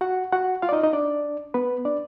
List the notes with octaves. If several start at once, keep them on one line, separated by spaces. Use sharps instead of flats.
F#4 F#5
F#4 F#5
F4 F5
D5
D#4 D#5
D#4 D#5
D4 D5
B3 B4
D4 D5